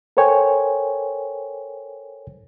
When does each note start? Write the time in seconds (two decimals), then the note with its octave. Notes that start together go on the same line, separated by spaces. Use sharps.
0.17 A4 A#4 C5 C#5 G5 G#5